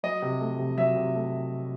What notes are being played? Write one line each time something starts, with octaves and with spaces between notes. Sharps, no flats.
F#3 D#5
C3
A3
C3
F#3 E5
C3
A3